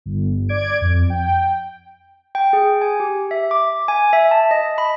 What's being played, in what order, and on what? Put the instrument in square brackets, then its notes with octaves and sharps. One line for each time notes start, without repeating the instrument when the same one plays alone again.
[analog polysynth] G1
D5 G#6 D7
F2
G5
[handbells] G5
G#4
G#5
G4
E5
D6
G#5
E5
A5
D#5
B5